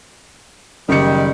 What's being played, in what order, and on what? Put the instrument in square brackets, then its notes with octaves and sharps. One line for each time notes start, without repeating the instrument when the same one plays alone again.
[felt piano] F#1 C#7 [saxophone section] D#3 G3